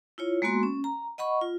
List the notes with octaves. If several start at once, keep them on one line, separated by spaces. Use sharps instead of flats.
E4 F4 C#5
G#3 A#3 B3 F#4 C6
C#4
A#5
D#5 F#5 B5 C#6
F4